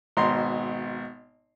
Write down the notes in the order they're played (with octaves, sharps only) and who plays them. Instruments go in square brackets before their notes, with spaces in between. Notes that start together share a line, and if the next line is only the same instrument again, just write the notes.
[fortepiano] G#1 B2 A#5 C6